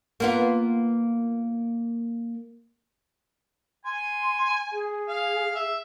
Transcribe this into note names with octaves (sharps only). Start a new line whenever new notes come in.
A#3 B3 F4
G#5 C6
G#4
F5
E5